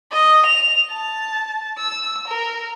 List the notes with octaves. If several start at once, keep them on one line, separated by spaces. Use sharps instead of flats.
D#5
F7
A5
E6
A#4